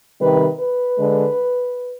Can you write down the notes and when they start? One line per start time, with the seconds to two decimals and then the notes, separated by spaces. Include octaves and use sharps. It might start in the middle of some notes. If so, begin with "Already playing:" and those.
0.20 C3 D#3 G3 B4
0.59 B4
0.98 D3 G#3